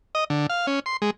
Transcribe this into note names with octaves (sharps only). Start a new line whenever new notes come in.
D#5
D3
F5
C#4
C6
G#3